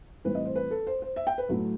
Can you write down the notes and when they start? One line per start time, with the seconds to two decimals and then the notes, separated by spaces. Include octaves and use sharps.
0.24 A2 E3 G3 C4 B4
0.35 D#5
0.45 C5
0.56 B4
0.71 A4
0.87 C5
1.02 C5
1.16 E5
1.27 G5
1.38 B4
1.48 A2 F#3 A3